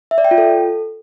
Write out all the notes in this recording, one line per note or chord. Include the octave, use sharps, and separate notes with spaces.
E5
D5
G5
F4
A4